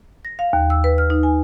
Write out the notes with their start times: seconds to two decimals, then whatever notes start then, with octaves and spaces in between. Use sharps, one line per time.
0.25 A#6
0.39 F5
0.53 D#2
0.70 E6
0.84 B4
0.98 F6
1.10 D#4
1.23 G#5